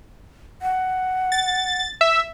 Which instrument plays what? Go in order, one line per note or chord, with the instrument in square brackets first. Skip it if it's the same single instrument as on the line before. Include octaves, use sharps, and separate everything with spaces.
[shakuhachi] F#5
[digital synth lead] A6
E5